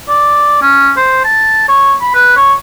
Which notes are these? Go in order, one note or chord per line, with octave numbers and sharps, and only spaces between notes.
D5
C#4
C5
A5
C#5
B5
B4
C#5